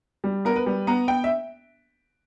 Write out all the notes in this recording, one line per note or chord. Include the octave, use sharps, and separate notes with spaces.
G3
B3 A#4
B4
G3
B3 A#5
B3 G5
E5